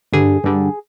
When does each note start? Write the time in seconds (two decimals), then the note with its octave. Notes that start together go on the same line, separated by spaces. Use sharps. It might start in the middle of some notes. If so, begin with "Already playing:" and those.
0.13 G2 D3 G3 G#4
0.44 G2 D3 G3